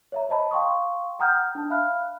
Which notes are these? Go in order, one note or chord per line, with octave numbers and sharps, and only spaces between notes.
C#5 E5 A#5
C5 D#5 A5 B5
F5 G5 C6 C#6 D#6
F#5 G5 A#5 D#6 F6 G6
D4 A5
E5 F5 B5 F6 F#6